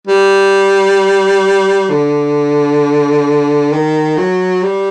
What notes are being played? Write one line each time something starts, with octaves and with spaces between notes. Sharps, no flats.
G3
D3
D#3
F#3
G3